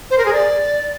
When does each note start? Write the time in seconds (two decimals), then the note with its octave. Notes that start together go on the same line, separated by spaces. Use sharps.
0.11 C5
0.18 A#4
0.26 G#4
0.33 D5